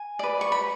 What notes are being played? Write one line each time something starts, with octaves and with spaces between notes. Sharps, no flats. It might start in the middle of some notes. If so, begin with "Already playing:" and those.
Already playing: G#5
B4 D5
C#6
B5